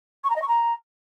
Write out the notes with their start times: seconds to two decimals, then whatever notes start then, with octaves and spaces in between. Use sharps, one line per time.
0.24 C#6
0.30 A#5
0.36 D#5
0.42 C#6
0.48 A#5